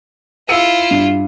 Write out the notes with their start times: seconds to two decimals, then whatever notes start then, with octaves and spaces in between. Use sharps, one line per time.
0.49 E4 F4 E6 C#7 D#7
0.91 G2